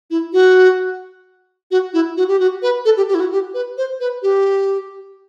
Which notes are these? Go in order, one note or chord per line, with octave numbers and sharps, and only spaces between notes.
E4
F#4
F#4
E4
F#4
G4
F#4
B4
A4
G4
G4
E4
F#4
G4
B4
C5
B4
G4